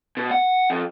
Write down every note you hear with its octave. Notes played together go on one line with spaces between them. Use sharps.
B2
F#5
F2